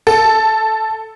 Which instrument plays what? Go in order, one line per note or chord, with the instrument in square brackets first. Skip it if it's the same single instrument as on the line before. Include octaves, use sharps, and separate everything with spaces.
[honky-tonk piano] A4